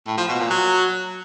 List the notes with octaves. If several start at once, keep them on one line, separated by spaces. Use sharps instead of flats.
A2
F3
B2
A#2
F#3